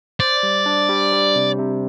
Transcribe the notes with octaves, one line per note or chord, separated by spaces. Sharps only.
C5 D5
G3
D4
G3
G3
C3
C3